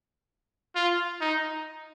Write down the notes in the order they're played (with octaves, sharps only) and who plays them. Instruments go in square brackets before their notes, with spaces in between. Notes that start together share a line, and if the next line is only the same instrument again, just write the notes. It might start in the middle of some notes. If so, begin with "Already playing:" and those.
[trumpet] F4
D#4